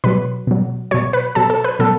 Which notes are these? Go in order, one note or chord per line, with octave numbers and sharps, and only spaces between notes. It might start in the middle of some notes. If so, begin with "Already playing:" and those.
B2 F#3 B4
B2 F#3
B2 F#3 C#5
B4
B2 F#3 A4
A4
B4
B2 F#3 A4